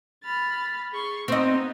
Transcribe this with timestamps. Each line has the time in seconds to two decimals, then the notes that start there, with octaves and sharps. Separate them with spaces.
0.24 B5 F6 A6
0.90 G#4 C6 C#6
1.28 B3 C4 D#4 D#5